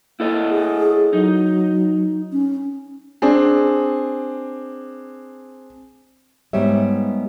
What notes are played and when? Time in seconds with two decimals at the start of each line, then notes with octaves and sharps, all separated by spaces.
0.20 A#3 E4 A4 D#5
0.50 G#4
1.13 F#3 D#4
2.32 C#4
3.22 C4 D4 G#4
6.53 G#2 G3 B3 C#5 E5